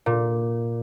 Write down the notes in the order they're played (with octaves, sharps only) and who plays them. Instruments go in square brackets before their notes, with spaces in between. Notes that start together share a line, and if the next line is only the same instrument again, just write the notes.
[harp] A#2